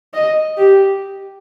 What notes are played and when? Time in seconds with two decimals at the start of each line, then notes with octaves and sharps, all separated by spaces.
0.14 D#5
0.57 G4